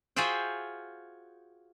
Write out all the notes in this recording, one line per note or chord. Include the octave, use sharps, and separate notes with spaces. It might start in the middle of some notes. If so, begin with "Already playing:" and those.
F4 F#4 G#4 C5 E5 G5